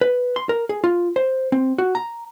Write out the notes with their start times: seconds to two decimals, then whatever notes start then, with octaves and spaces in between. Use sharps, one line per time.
0.01 B4
0.36 C6
0.49 A#4
0.69 G#4
0.84 F4
1.16 C5
1.52 C4
1.78 F#4
1.95 A#5